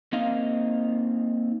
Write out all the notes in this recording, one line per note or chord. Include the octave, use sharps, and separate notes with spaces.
A#3 C4 D#4 D#5 F5